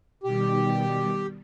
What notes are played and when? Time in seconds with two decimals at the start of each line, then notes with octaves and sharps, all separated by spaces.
0.24 B2 D#3 G3 G4